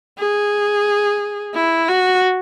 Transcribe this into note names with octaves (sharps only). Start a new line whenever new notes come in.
G#4
E4
F#4